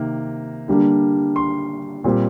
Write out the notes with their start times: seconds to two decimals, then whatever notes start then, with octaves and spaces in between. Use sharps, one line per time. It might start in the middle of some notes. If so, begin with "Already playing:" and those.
Already playing: C3 D#3 A#3
0.68 D3 G3 A#3 D4
1.36 C6
2.04 A#2 G3 C4